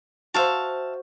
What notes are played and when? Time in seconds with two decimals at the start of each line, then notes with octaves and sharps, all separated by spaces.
0.34 F#4 C5 E5 F5 A5